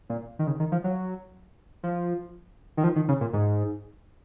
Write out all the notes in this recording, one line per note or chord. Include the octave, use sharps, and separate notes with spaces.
A#2
D#3
C#3
D#3
F3
F#3
F3
D#3
F3
D#3
C#3
A#2
G#2